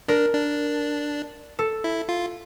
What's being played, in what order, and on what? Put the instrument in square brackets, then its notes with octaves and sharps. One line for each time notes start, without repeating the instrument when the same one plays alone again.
[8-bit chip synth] D4 [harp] A#4
[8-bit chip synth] D4
[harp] A4
[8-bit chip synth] E4
F4